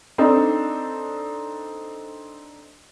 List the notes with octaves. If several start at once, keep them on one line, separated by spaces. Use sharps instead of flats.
C4 D4 D#4 A4